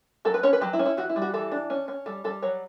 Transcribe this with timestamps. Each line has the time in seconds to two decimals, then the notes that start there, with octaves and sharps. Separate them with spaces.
0.25 F#3 A4
0.34 B4
0.43 C#4 C#5
0.53 B4
0.61 F#3 G4
0.73 E4
0.79 C#4
0.85 E4
0.97 E3 F#4
1.09 E4
1.16 G3
1.22 F#4
1.34 E3 A4
1.52 D4
1.70 C#4
1.88 C#4
2.06 G3 A4
2.24 G3 A4
2.42 F#3 C#5